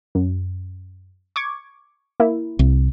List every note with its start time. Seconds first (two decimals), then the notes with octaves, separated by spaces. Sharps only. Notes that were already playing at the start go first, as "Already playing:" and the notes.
0.15 F#2
1.36 C#6 D6 G#6
2.20 A#3 E4
2.59 C2